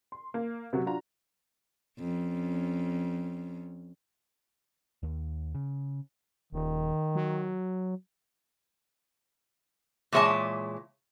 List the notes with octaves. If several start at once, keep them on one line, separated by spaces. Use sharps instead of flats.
C6
A#3
C3 F#3 F#4
D4 F4 F#4 A#5
F2 C#4
D#2
C#3
D#1 D#3
F#3
A#2 E3 G#3 C#5 E5 A5